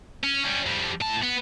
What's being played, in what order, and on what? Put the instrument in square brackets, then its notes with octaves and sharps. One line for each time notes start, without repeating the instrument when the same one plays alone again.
[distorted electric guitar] C#4
G3 C#4
F2 G3
A2 A5
B3